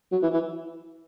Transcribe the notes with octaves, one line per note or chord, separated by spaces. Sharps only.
F#3
E3
E3